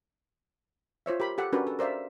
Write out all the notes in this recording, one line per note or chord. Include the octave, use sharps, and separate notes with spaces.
F4 C5 C#5 E5
G4 A#4 B5 C6
G4 A4 F#5
C#4 D4 F#4 G4 A#4 B4
A4
A#4 C5 D5 E5 F5